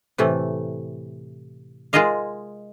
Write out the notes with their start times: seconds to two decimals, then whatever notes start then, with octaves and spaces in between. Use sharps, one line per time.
0.18 A2 C3 E3 A3
1.93 G#3 F4 G#4 A#4 D#5 F5